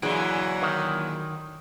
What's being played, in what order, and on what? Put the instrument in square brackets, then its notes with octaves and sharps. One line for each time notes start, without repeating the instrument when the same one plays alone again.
[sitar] A#2 D3 E3 [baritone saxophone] F#3 [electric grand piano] E4 G#4 D7
[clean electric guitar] D#3